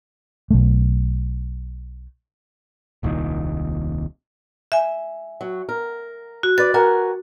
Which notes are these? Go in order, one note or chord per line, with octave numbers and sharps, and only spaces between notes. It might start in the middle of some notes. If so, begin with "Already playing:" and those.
B1 A3
D#1 C2 A#2 D#3
E5 G#5
F#3
A#4
F#4
B4 D5 D6 A6
F#4 A#4 G#5